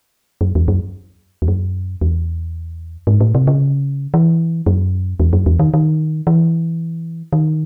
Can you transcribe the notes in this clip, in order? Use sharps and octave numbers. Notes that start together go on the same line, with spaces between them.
F#2
E2
F#2
E2
F#2
E2
G#2
A2
C3
C#3
E3
F#2
E2
F#2
E2
D#3
D#3
E3
D#3